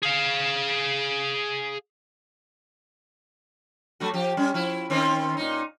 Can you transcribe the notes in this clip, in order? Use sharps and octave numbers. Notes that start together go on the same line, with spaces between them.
G#4 F5
F#3 A3 F#4
F3 G4
G3 C#4
F3 E4
D#3 C4 C#4
A#2 D#4